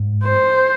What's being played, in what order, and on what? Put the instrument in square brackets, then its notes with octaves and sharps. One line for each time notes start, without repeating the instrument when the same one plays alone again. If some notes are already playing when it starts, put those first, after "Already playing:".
Already playing: [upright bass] G#2
[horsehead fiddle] C5